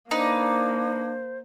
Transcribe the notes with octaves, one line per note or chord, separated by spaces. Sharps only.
A#3 D4 D#4 B4 C5